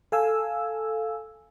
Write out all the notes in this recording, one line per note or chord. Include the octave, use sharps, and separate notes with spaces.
A4 F5 G#5 E6